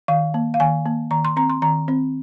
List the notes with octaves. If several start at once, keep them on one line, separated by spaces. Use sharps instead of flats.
D#3 F5
A#3
F5
D#3 G#5
A#3
D#3 A#5
C6
C4 A#5
C6
D#3 A#5
C4